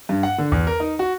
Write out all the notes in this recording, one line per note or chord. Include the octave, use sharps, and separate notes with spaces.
G2
F#5
D3
E2
A#4
D#4
F#4